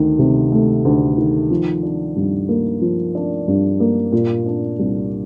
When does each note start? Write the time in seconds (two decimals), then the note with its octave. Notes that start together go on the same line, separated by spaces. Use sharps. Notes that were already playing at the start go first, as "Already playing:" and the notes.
Already playing: D2 D#3
0.19 C3
0.52 A3
0.85 D2
1.18 D#3
1.51 F3
1.83 D4
2.16 G2
2.49 A#3
2.82 F3
3.15 D4
3.48 G2
3.80 A#3
4.12 A#2
4.46 D4
4.79 C2